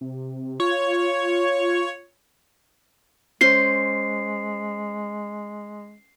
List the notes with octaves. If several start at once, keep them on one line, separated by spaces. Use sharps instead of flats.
C3
F4 C#5
G#3 C#4 C5 C6 C7